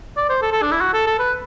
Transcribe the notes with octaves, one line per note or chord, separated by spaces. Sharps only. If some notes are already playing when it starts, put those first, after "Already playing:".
D5
C5
A4
A4
D4
E4
F#4
A4
A4
B4